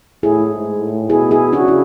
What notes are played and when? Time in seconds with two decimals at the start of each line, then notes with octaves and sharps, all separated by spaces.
0.23 A2 E4 G#4
0.52 G#2
0.81 A2
1.10 B2 E4 G#4
1.31 E4 G#4
1.53 C#3 D4 F#4
1.68 E4